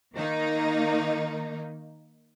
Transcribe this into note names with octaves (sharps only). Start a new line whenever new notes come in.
D#3 A#3 D#4